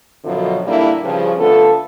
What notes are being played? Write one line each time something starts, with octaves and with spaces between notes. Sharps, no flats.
F#2 B2 D3 F3 F#3
A#2 D3 G3 A#3 D4 E4
G2 C#3 F3
D3 A3 B3 F4 A4